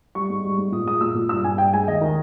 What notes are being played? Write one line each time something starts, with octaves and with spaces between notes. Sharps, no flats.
G3 C#6
G#2
G3
G#2
A#2 D#6
G#3 D#6
A#2 E6
A#2
G2 E6
G2 G#5
G2 G5
G#3 G#5
D#2 D#5
D#3